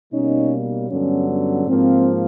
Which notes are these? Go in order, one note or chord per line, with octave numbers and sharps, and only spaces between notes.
B2 G3 A#3 C#4 D#4
G2 D3 F#3 B3 C#4
C#4
G#2 F3 A#3 C4